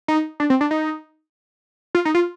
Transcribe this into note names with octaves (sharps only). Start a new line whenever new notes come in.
D#4
D4
C4
D4
D#4
F4
D#4
F4